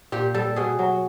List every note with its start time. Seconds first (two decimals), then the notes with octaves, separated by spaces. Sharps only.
0.12 A#2 G4
0.34 G3 A4
0.56 B2 G#4
0.79 F#3